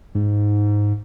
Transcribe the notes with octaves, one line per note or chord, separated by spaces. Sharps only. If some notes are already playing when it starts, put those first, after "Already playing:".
G#2